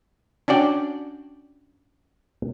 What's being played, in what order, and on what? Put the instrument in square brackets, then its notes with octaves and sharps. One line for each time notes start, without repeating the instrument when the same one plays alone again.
[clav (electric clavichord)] C#4 D4 F#4 D5 G5